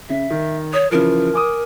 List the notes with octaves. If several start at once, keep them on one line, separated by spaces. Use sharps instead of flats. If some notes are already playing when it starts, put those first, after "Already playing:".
C#3 E5
D#3
C#5 D#6
C#3 E3 F3 A#4
G#5 D6 D#6